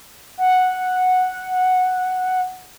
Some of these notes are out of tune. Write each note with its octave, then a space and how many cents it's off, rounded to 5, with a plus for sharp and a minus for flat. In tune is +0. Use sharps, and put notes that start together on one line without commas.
F#5 -5